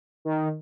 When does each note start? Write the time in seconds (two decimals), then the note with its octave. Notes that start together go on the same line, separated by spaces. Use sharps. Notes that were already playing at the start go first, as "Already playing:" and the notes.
0.25 D#3